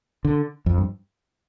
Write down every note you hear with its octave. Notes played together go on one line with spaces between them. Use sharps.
D3
F2
G2